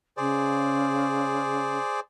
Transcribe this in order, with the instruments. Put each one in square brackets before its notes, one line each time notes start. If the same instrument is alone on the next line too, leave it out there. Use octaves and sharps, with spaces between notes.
[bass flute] C#3 [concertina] G#4 C5 D5